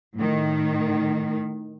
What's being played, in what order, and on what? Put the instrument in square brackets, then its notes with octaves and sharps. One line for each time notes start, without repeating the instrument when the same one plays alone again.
[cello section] A2 D#3